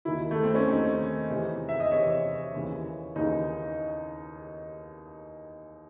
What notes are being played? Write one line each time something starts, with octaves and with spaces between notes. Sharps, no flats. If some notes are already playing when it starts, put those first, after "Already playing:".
D#2 D#3 E4
A3
C4
C#4
D#2 D#3 D#4
E2 C3 E3
E5
D#5
E2 C3 E3 C#5
D#2 C#3 E3
D#2 C#3 E3 D#4